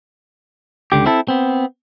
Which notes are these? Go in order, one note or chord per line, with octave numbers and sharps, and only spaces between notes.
C#2 D3 G4
C4 E4 A4
B3 C4